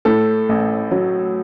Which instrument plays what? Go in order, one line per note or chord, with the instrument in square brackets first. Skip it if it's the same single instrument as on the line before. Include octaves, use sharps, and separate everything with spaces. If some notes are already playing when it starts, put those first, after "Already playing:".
[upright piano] A2 A4
A1
F#3